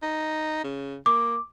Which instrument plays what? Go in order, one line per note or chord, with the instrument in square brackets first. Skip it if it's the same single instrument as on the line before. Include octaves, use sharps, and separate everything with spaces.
[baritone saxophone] D#4
C#3
[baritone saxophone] A#3 [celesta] D6